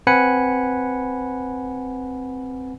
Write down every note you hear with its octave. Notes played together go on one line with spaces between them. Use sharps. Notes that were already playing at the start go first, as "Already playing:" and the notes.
C4 B4 F#5 G#5 B5 C#7